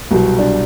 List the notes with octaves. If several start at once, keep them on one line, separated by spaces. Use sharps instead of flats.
C2 B2 F#3
D4